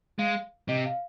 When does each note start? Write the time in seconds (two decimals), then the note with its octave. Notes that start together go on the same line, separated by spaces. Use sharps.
0.19 G#3 F5
0.68 C3 D#5
0.86 F5